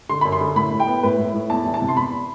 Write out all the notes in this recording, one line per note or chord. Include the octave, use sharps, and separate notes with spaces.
D3 C6
F#2 B5
C6
D3
A2 B5
A2
G5
B3
A2 B4
A2
A2
E2 A5
E3
A5
C3
C6
E2 B5